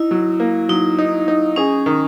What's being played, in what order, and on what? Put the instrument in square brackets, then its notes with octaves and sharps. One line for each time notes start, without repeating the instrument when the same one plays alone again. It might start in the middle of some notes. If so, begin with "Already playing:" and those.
Already playing: [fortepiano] D#4 [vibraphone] E4
[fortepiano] F#3
A#3
[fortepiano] F#3 [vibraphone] D#4
[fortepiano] D#4
D#4
[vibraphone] C#4 [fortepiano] G#4
[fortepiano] D#3